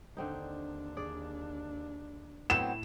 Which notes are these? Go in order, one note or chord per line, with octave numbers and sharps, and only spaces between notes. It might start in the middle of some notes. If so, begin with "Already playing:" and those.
D#2 D3 C4 D4 D#4
G#4 D5
A2 F#3 B3 C4 E4 E7